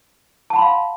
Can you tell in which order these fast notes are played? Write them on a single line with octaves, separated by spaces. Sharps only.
A5 F#5 B5 C6 F5